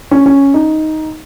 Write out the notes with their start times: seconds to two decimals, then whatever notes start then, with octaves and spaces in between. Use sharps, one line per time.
0.11 C#4
0.26 C#4
0.54 D#4